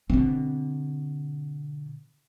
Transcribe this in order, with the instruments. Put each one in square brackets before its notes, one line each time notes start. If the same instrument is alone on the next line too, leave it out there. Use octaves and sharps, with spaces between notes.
[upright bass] B2 D3 [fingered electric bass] C4